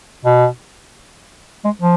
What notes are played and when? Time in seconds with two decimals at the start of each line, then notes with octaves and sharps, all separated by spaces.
0.25 B2
1.65 G#3
1.82 F3